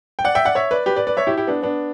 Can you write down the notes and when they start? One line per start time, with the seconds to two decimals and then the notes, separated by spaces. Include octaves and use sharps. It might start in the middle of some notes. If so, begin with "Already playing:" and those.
0.19 G5
0.25 D5 F#5
0.35 E5 G5
0.45 D5 F#5
0.55 C#5 E5
0.71 B4 D5
0.86 G4 B4
0.96 B4 D5
1.07 B4 D5
1.17 C#5 E5
1.27 E4 G4
1.37 E4 G4
1.47 B3 D4
1.62 B3 D4